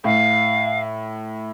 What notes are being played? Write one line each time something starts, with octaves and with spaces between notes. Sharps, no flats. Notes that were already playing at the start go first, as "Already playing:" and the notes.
A2 F5